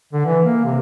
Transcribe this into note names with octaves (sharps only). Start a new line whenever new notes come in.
D3
E3
A#3
C3